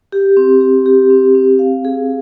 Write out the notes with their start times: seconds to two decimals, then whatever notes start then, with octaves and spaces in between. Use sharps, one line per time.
0.12 G4
0.37 C4
0.61 G4
0.86 G4
1.10 C4
1.35 C4
1.59 F5
1.85 G#4